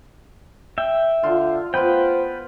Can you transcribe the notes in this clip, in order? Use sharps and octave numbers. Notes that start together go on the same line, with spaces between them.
E5 G5
D3 F4
B3 F4 B4 C5 G5